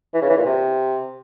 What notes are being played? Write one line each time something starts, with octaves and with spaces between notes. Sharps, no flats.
E3
C#3
E3
A#2
C3